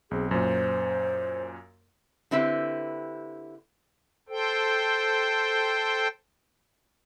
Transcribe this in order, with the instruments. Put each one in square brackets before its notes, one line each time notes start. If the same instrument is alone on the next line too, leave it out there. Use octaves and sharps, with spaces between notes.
[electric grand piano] B1 C4 [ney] G#4
[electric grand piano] F#2 A#2 [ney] C5
[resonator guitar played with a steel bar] D3 C4 E4 G4 B4
[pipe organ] A4 C5 G5